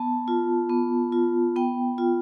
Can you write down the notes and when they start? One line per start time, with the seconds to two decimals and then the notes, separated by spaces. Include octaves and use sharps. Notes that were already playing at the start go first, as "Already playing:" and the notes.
Already playing: B3 A5
0.28 F4
0.70 B3
1.12 F4
1.56 B3 G5
1.98 F4